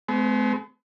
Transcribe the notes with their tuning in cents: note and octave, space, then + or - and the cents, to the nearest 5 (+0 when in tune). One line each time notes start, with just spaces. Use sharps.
G#3 +45 C4 -45